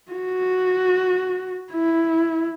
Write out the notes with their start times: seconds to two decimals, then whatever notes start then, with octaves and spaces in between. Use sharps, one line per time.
0.12 F#4
1.72 E4